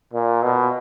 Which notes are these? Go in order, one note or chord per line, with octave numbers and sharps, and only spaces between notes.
A#2
B2